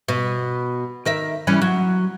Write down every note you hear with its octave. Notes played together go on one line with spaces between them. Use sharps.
B2
D#3 A#4 E5
E3 G3 C#4
F#3